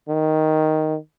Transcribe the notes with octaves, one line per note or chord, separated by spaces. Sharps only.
D#3